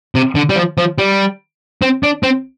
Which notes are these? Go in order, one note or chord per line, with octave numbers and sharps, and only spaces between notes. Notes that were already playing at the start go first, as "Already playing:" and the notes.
C3
D3
G3
F3
F3
G3
C4
D4
C4